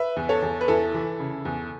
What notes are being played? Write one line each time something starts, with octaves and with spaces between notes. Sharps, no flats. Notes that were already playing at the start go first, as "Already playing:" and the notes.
Already playing: B4 E5
E2
A4 C#5
E2
B4
E2 E4 A4
E3
C#3
E2